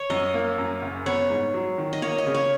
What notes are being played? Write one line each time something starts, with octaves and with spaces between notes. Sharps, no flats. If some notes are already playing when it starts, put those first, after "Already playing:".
Already playing: C#5
F#2 D#5
A#3
F#2
F#1
B3 C#5
G#2
F#3
D#3
D#5
A#3 C#5
D#5
C#3
C#5